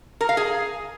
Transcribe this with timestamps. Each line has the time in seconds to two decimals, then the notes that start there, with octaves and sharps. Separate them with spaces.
0.21 A#4
0.29 F5
0.37 G#4